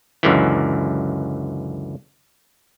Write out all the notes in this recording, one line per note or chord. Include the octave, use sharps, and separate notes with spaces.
C#2 F#2 D3 E3